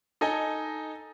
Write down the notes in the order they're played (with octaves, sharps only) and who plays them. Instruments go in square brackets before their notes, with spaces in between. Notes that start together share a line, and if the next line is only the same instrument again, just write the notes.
[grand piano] D#4 A4 D#5 G#5